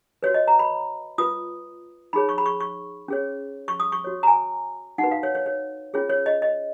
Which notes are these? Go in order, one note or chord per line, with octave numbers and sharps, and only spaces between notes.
F#4 B4 C#5
D#5
A#5
B5
F4 B4 D#6
D#4 G#4 C#5 B5
C#6
B5
C#6
C#6
C#4 G#4 C#5
C#6
D#6
C#6
F#4 C#5
A#5
G#5
D#4 F#4 B4 F#5
F5
C#5
C#5
C#5
C#4 F4 G#4 C#5
C#5
D#5
D#5